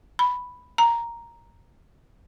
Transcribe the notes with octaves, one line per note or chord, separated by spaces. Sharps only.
B5
A#5